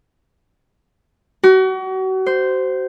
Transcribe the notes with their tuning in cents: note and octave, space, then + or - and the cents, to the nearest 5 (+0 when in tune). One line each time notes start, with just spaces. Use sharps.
F#4 +35
C5 -10